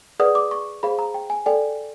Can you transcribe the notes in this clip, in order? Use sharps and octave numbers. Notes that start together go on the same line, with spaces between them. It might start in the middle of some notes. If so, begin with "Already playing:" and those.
G#4 B4 D5 F#5 D#6
D6
C#6
G#4 C5 F5 B5
A#5
G5
G#5
A4 D5 G5 G#5